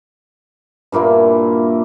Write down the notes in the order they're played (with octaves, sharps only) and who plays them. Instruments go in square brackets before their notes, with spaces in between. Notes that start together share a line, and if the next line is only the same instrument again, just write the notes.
[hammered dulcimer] G2 A#2 A#3 E4